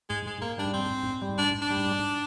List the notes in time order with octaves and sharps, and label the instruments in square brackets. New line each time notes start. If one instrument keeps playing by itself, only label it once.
[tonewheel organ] G#2 [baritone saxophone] G#3
[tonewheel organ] G#2 [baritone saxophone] G#3
[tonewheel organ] G#2 [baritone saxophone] A#3
[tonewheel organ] G3 [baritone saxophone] D4
[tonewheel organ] G#2 [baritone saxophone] C4
[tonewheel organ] G#2
G#2
G3
[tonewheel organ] G#2 [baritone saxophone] D4
[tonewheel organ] G#2
[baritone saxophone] D4
[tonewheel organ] G3
G#2